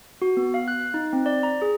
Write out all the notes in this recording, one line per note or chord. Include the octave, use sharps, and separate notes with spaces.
F#4
B3
F5
F#6
D#4
C4
D5
A#5
G#4